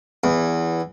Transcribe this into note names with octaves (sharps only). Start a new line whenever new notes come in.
E2